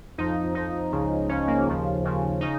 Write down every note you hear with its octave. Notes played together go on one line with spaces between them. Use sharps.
F2 F3 D#4
F2 F3 D#4
C#2 C#3 F3
C#2 C#3 F3 C#4
A#3
D#2 C#3 F3
D#2 C#3 F3
C#3 D#4